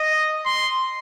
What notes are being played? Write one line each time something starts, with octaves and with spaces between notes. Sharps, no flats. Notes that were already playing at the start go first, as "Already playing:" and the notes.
Already playing: D#5
C6